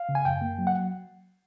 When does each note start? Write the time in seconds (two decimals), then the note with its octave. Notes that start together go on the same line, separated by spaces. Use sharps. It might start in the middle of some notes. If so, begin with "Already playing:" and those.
Already playing: F5
0.09 C#3
0.15 G#5
0.25 F#2 G5
0.41 A#3
0.59 F#3
0.67 F#5